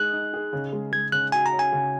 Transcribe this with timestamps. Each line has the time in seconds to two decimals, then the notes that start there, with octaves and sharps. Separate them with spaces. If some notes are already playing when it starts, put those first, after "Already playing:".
Already playing: G#3 D#4 G#4 F#6
0.13 D#4
0.33 G#4
0.53 C#3
0.73 G#3
0.92 G#3 G#6
1.12 C#3 F#6
1.32 F#4 G#5
1.46 A#5
1.53 C#4
1.59 G#5
1.72 C#3